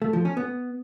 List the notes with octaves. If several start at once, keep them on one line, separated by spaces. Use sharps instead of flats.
A3
F3
C#4
B3